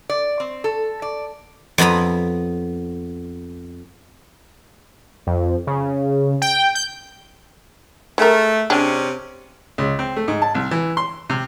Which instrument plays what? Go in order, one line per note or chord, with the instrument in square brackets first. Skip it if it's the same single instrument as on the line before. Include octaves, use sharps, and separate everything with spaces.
[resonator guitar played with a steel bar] D5
C4
A4
D5
[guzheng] F2 B3 B4 A#5 B5
[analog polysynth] F2
C#3
G5
G6
[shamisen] G#3 A#4 [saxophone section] A3
[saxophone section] C3 C#4 [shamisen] G#3 D4 G4
[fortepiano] C#2
C4
A3
G#2
A5
C2
E3
C6
C3